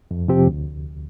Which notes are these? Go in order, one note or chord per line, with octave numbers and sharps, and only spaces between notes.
F2
C3 F3 C4 G4
D2